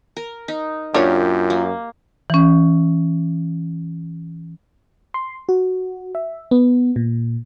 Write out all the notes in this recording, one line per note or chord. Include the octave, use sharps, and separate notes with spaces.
A#4
D#4
F#2 A#3 D4 F4 G4 A#4 C#5
A#3
E3 C#4
C6
F#4
E5
B3
A#2